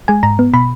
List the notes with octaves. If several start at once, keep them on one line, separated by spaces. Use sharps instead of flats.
G#3 G#5
G#2 A#5
B3
B2 B5